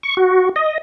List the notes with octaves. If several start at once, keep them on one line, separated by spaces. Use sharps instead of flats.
C#6
F#4
D#5